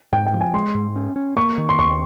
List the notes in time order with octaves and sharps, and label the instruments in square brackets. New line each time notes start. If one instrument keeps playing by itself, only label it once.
[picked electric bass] G#2 [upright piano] G5
[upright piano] G5
[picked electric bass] F3
[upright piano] G#5
[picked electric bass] G#3 [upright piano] C6
[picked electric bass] G#2
C#4
C#4
[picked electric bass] A#3 [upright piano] C#6
[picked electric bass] D#3
[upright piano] C6
[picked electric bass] D#2 [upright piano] C#6